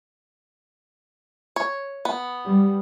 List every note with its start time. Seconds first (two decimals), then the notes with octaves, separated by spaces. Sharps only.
1.56 C#5
2.05 B3
2.46 G3